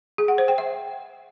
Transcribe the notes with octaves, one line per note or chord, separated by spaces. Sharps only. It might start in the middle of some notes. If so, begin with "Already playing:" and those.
G#4
F#5
C5
G5
E5